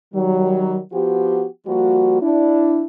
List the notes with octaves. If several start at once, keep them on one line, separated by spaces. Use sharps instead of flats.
D#3 F#3 G3
F3 B3 F#4 G4
F3 G3 A#3 F#4
D4 E4